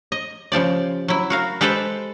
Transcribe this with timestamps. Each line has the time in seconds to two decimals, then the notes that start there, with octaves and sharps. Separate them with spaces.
0.12 D#5
0.52 C#3 F3 G4 D5
1.08 F#3 E4
1.30 F#4 A#4 F5
1.61 G#3 G4 A4 B4 C5